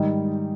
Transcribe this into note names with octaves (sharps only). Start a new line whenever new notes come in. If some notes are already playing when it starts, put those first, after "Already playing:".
Already playing: G#2 D#3 G3 D#4